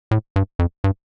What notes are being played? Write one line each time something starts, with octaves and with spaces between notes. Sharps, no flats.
A2
G2
F2
G2